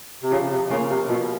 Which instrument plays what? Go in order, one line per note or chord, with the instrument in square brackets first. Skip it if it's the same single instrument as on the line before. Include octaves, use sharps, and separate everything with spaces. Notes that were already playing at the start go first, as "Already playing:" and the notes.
[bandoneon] C3
[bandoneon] C#3 [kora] F3
[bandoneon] C3
[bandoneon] C#3 [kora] A#3 C#4 F4
[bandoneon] C3
[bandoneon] B2 [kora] F3